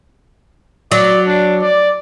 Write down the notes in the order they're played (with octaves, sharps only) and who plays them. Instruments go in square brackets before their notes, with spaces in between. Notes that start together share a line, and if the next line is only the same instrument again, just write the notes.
[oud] F#3 [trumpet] D5
[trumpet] D4
D5